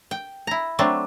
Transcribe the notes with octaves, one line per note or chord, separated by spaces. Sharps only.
G5
E4 A#5
F#3 A3 C4 D4